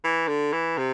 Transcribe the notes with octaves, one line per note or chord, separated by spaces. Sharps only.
E3
D3
E3
C3